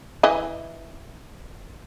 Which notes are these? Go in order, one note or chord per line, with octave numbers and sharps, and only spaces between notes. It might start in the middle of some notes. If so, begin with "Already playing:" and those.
E3 D#5